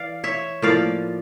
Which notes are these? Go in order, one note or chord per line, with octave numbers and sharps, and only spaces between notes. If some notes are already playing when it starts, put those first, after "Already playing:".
Already playing: E3 D5 F5
C#5 E5
A2 F3 A#3 D5 F5